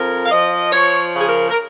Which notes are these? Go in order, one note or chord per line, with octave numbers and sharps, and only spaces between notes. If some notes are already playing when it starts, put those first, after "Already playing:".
Already playing: F2 F3 A#4
F5
F3 D#5
F3 C#5
C#3
G#4
A#4
A#4